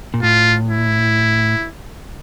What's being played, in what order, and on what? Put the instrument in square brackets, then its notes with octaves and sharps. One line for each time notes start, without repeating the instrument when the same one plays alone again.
[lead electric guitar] A#2
[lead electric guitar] A2 [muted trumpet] F4
[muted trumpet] E4